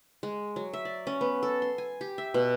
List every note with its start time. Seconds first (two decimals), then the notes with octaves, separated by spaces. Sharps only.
0.23 G#3
0.56 F#3
0.73 E5
0.85 D5
1.07 C#4
1.21 B3
1.43 A4
1.62 C6
1.78 G#5
2.01 G4
2.18 E5
2.34 B2